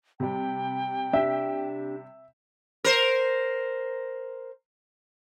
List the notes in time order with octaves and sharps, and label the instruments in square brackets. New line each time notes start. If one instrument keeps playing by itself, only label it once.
[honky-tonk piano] C3 G3 [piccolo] G5
[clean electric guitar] D4 G4 [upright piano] E5
[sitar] A#4 C5